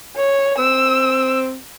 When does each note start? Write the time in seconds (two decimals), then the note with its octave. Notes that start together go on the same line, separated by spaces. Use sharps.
0.17 C#5
0.58 C4 E6